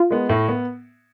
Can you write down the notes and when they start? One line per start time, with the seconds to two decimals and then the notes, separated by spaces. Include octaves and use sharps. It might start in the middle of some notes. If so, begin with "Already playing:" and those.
Already playing: F4
0.10 G#3 B3
0.29 A2
0.49 B3